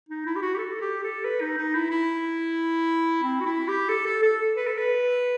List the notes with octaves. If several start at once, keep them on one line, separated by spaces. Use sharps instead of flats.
D#4
E4
G4
F#4
G4
A4
G4
A4
B4
D#4
D#4
E4
E4
C4
F#4
E4
G4
A4
A4
A4
B4
A4
B4